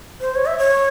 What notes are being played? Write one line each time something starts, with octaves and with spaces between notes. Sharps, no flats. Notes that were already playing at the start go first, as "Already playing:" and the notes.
C5
C#5
E5
C#5